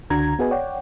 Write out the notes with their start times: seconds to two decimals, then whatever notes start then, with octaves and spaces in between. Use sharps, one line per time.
0.10 C#2 D3 D4 F#4 A#5 G#6
0.39 B3 F#4 G#4 B4 D#5 G#5
0.51 C#5 D5 F#5 G5